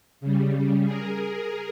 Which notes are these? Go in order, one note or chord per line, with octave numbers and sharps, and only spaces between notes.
C#3 G3
G#4 A#4